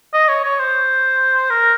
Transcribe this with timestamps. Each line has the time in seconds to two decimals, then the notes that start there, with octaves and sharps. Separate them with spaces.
0.14 D#5
0.29 C#5
0.44 C#5
0.60 C5
1.50 A#4